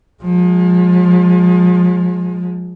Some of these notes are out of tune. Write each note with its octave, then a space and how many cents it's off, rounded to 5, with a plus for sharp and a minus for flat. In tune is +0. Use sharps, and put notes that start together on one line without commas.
F3 +35 G#3 +0